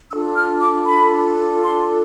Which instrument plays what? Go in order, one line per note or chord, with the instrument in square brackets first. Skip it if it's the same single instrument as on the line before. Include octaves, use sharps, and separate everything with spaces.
[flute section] D4 F4 A4 E6
F6
D6
B5
C6